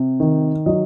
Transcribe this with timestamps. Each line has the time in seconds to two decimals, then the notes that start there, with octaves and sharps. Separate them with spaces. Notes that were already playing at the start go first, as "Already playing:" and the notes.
Already playing: C3
0.20 D#3
0.66 F#3 D#5